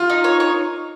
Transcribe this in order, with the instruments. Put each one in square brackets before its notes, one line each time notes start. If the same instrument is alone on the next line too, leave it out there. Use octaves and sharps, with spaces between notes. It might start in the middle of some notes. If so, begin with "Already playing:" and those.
Already playing: [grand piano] F4
[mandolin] D#4
C#5
C#5